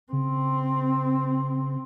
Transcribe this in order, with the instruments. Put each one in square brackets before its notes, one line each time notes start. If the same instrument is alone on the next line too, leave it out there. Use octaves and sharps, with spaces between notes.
[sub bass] C#3 [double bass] C4